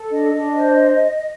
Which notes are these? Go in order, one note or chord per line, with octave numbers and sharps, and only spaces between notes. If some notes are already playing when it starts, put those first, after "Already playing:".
Already playing: A4
D4 D#5
D4
C5